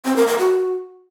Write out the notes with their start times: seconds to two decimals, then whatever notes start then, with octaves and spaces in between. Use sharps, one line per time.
0.05 C4
0.16 A#4
0.27 A#4
0.39 F#4